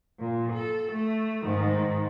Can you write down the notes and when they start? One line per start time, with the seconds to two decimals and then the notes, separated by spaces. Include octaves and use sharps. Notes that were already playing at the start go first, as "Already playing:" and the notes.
0.20 A#2
0.53 A4
0.92 A3
1.45 G#2 D#3